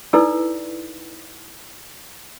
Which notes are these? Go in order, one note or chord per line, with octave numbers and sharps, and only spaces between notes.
D#4 E4 A4 B4 D5 E6